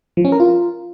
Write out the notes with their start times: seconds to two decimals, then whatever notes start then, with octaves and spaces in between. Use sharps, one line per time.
0.17 F3
0.25 C#4
0.32 A#4
0.40 F4